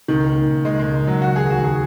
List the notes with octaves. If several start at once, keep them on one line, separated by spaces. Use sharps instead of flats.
C#2 D#3
A#3
C#2
C#2 G#3
C#2 G#3
C#2 F#3
D#3 F#4
D#2 G#4
F#4
D#2
G#4